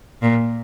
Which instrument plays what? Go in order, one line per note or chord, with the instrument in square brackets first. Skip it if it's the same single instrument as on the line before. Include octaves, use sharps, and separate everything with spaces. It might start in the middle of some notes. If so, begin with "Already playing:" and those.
[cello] A#2